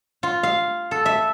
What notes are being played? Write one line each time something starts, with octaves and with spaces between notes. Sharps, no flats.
F4
F5
A4
E5